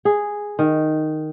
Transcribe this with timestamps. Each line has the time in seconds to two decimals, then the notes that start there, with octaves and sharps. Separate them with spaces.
0.05 G#4
0.59 D#3